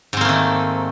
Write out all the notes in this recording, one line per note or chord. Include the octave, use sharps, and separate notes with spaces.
G#2 D#3 A3 A#3 C4